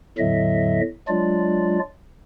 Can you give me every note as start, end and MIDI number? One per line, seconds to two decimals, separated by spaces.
0.18 0.81 40
0.18 0.81 45
0.18 0.81 50
0.18 0.81 54
0.18 0.81 75
0.18 0.81 76
1.08 1.79 54
1.08 1.79 56
1.08 1.79 62
1.08 1.79 65
1.08 1.79 74